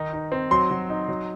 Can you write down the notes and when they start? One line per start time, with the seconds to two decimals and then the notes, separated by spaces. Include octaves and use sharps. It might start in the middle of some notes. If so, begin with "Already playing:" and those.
Already playing: D#3 D#4
0.13 D#4
0.32 C4
0.51 F#3 C6
0.71 F#3
0.90 D#4
1.08 F#3